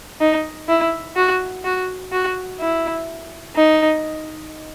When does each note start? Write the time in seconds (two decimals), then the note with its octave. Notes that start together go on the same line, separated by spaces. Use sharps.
0.20 D#4
0.68 E4
1.16 F#4
1.64 F#4
2.12 F#4
2.60 E4
3.56 D#4